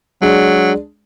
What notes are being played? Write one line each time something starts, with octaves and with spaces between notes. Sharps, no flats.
F#3 G#3 D4 G#4